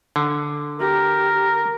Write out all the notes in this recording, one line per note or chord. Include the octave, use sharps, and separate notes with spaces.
D3
G4 A#4